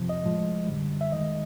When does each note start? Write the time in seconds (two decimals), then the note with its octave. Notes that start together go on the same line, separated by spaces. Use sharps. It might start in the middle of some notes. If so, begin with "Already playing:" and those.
Already playing: F2 C3 F3
0.09 D#5
0.23 A2 F3 G#3
0.67 F#2 D3 G3
1.01 E5
1.11 D#2 D#3 G#3 D#5